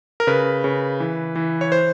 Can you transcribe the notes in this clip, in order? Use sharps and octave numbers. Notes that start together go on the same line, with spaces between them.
A#4
C#3 B4
C#3
E3
E3
C#5
C5